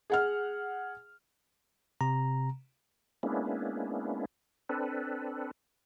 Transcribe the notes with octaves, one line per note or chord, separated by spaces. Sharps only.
G#4 F#5 F6
C3 A#5
G#3 A#3 B3 C#4 D4 E4
C4 D4 A4 B4